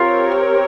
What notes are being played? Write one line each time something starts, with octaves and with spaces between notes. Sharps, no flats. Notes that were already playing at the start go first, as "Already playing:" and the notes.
Already playing: C4 F4 G4 A#4 C#5